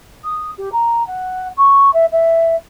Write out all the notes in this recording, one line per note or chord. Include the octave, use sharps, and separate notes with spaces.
D#6
G4
A#5
F#5
C#6
E5
E5